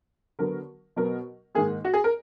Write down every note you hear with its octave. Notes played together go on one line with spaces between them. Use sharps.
D3 F#3 B3 A#4
B2 F#3 B3 A#4
G#2 D#3 A#3 G#4
F#4
G#4
A#4